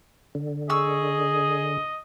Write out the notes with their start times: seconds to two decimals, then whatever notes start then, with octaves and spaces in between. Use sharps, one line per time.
0.35 D3
0.70 G#4 D#5 C#6 E6